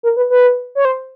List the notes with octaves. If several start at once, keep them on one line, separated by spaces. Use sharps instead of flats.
A#4
B4
B4
C#5
C5